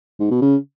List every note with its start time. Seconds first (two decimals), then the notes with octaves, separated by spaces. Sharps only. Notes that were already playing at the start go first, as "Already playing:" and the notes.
0.20 G#2
0.31 B2
0.42 C#3